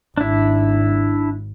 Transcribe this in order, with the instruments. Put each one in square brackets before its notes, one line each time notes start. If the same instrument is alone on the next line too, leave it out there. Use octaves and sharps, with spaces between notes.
[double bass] G#1 [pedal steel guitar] D4 E4